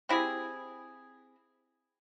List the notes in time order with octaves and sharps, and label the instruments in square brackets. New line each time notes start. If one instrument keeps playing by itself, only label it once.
[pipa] C4 E4 G4 G#4